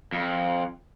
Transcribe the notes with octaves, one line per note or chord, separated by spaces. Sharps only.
F2